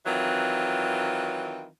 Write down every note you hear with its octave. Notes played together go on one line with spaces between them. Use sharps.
D#3 E3 F#3 C4 F4